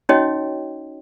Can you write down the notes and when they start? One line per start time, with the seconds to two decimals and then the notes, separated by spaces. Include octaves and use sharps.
0.09 C#4 D#4 F#4 C#5 D#5 G5